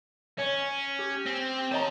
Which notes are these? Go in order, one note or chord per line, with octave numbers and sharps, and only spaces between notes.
C#4 C#5
G4
C4
C#5 D#5 A5 A#5 C6